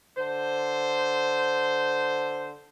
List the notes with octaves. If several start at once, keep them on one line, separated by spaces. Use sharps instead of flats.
D3 C5